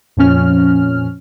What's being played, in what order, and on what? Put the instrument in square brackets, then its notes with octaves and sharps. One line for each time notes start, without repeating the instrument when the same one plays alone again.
[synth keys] F2 A#2 F3 C#4 F6